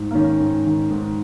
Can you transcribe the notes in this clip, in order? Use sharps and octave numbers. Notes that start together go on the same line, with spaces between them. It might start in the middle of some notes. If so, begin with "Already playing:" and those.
Already playing: G#2
A#3
D#3 C#4
G#2
D#3
G#2